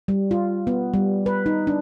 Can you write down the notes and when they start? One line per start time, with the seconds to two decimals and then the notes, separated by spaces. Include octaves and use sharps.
0.08 G3
0.31 F4
0.67 B3
0.94 G3
1.26 B4
1.46 D#4
1.67 D4